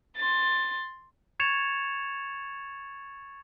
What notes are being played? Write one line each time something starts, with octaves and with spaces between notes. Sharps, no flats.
C6 A6
C#6 G#6 A6 C#7 E7 F7